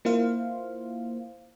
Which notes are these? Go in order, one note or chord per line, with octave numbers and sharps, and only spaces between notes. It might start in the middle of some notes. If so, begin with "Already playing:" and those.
A#3 E4 F4 C5 F5